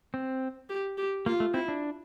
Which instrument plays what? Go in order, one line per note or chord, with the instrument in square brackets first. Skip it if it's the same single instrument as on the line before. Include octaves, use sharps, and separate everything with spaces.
[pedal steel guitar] C4
[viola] G4
G4
[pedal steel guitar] A#3 [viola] F4
[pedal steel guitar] A3
[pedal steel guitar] C4 [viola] E4
[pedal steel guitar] D4